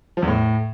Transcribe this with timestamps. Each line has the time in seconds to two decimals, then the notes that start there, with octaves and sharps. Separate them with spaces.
0.17 F3
0.22 E2
0.28 A2